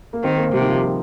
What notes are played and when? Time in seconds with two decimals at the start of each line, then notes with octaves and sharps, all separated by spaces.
0.13 A#3
0.23 D#3 C4
0.38 A#3
0.53 C3 G3
0.61 D#3
0.67 F3
0.83 F3